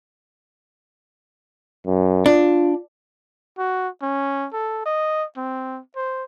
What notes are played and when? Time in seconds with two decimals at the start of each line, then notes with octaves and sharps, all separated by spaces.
1.86 F#2
2.26 D4 F4
3.58 F#4
4.02 C#4
4.53 A4
4.86 D#5
5.37 C4
5.96 C5